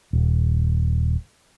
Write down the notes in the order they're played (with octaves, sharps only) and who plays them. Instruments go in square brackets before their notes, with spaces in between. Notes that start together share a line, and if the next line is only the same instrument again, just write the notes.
[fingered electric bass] D#1